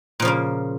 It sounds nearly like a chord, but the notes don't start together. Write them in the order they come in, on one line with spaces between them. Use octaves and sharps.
A#2 F3 C#3 A#3